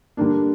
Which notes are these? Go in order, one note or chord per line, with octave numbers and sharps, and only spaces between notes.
D3 G3 A#3 D4